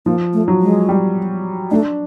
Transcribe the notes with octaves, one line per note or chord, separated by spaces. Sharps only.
F3 A#3
A3
F#3
G#3
G3
A3 D4